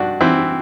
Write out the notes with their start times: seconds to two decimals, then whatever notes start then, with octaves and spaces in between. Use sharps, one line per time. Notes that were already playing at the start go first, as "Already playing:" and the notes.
Already playing: G2 D4 F#4
0.21 E3 C4 E4